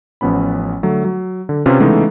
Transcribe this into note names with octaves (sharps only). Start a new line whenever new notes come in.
A1 F3 B3 C#4 B5
D3 F#3 A3
F#3
D3
C3 C#4 F4 B4
C#3 E3 G#3 A3 B3 D#4